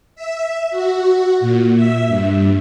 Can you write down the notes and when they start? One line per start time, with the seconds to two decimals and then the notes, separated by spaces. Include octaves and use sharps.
0.15 E5
0.71 F#4
1.40 A#2
1.75 E5
2.07 G2